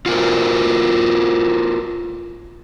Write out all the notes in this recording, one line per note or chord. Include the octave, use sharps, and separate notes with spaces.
F4 F#4 A#4 C5